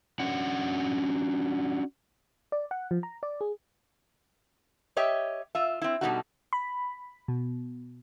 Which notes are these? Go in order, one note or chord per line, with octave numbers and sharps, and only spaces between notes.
C#4 D4 F#4 F#5
D5
F#5
F3
A#5
D5
G#4
G4 C#5 D#5 E5 G5
F4 E5
C4 E4
B2 D#3 G3 A3 D#4 F#4
B5
B2